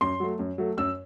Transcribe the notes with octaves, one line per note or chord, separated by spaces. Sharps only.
F#2 C6
F#3 A3
F#2
F#3 A3
F#2 E6